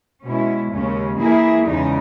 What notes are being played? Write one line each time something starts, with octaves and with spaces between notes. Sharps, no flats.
B2 G#3 C#4 E4
D#2 C#3 G#3 C#4
E3 A#3 E4 G#4
E2 C#3 G#3 D#4